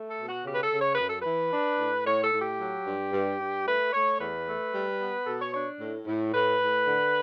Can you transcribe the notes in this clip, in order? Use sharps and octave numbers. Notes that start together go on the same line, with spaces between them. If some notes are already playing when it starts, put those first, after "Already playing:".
Already playing: A3
A4
B2
F#4
C#3 G4
B4
A4
C#3
C#5
F#2 B4
A4
E3 B4
D4
A2
A2 C#5
A4
A2
G4
F#3
G2
G2
G2
A3 B4
A3 C#5
E2 B4
A3
G3
B3
B2 A4
C#5
D4 C#5
A2
A2
A2 B4
A2
D3